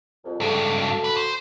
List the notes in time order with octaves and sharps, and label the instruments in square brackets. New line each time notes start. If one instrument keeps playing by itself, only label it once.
[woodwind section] C2 F2
[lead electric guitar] C#2 G2 [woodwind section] E4 G#4 A4
[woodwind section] F#4 A4
[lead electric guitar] B4
C5